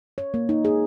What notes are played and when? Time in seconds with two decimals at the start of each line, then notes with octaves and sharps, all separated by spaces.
0.18 C#5
0.34 A#3
0.49 D#4
0.65 G#4